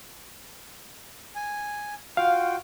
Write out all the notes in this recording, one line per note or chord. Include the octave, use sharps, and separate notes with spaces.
G#5
F4 F#4 F5 G5